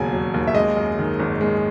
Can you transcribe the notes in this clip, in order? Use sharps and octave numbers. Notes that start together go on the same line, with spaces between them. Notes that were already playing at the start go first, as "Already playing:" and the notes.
Already playing: E1 D#2 C#3 F#3 G#5
F#3
D#2
E5
G#3 D#5
F#2
D#3
G#1
G#3